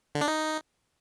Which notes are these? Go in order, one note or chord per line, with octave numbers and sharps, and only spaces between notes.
D3
D4
D#4